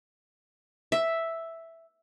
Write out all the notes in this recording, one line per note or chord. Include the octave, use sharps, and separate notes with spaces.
E5